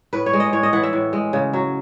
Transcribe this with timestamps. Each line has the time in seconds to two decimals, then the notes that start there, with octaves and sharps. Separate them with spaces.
0.13 A2 B4
0.26 C#5
0.33 G#3
0.40 D#5
0.53 A2 C#5
0.63 D#5
0.73 E3 F#5
0.83 E5
0.93 A2
1.13 G#3
1.33 C#3
1.53 F#3